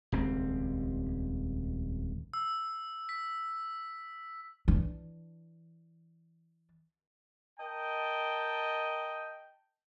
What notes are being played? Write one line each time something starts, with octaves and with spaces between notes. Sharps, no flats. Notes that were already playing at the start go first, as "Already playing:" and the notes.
D#1 C#2 C4
E6
B6
E3 D4
A#4 D#5 G5 A5